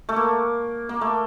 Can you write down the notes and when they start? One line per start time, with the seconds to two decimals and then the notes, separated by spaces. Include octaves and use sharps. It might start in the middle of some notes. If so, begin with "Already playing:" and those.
0.09 A3
0.16 A#3
0.89 A#3
1.01 A3